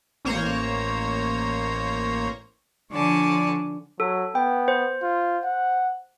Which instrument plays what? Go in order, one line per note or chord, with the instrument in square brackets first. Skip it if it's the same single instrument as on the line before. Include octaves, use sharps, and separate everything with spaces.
[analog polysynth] A1 A#3 C5 C#5 A#5
[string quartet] D3 F3 C#5 D5 G#5 A5
[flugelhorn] F#3 [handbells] A4
[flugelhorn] B3 [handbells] G5
[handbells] C5
[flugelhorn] F4
F#5